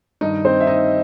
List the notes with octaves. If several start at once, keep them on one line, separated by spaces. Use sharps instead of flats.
G2 D#3 D#4 D#5
C4 C5
E5
D#4 D#5